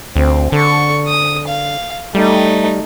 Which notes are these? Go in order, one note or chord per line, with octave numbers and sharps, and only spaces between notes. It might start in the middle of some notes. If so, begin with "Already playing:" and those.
D2 C4
D3 A4 C#6
D#6
F5
G3 A3 D#4